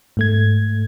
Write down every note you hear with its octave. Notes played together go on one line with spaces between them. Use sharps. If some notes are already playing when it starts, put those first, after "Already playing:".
G#2 A3 G#6